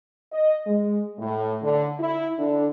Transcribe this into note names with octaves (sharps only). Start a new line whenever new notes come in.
D#5
G#3
A2
D3
E4
D3